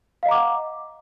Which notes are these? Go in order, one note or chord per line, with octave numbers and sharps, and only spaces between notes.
D#5 F5 F#5 A#5 D6